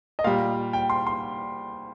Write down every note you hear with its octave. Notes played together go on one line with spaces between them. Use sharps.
D#5
A#2 G3 F5
G5
C6
C6